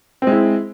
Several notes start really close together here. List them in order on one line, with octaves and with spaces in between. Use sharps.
C4 G#3 E4